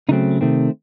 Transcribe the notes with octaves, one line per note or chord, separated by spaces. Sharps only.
C#3 F#3 A3 C4 D#4
C3 D#3 A3 C4